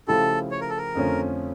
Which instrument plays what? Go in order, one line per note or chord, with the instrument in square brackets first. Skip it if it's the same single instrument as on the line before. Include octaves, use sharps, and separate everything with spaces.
[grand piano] C#3 F3 A3 E4 G4 [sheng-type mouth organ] A4
[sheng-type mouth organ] C#5
A#4
A4
A#4
[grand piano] F2 D3 F3 A3 C#4